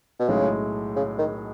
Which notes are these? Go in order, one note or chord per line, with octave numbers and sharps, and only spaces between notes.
B2
B1 A2 C#3 G#3
C#3
D#3